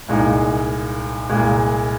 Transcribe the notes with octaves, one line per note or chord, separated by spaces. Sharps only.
C2 A#2 G#3 D#4
C2 A#2 G#3